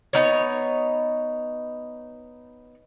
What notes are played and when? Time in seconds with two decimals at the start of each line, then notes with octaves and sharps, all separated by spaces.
0.13 B3 D#4 C#5